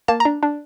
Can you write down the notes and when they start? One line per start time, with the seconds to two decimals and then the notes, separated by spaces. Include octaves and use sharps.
0.08 A#3 A5
0.20 A#5
0.25 D4
0.43 D4